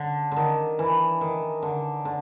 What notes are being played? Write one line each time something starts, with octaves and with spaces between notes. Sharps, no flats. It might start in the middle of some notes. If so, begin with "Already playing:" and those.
Already playing: D3
D3
D#3
E3
D#3
D3
D3